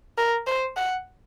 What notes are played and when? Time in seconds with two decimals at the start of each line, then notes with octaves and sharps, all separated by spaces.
0.18 A#4
0.47 C5
0.77 F#5